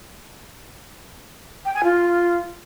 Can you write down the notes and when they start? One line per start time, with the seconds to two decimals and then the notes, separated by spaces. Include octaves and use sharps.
1.65 G5
1.74 G#5
1.84 F4